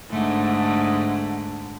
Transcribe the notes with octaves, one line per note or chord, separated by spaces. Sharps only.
G#2 D3 A3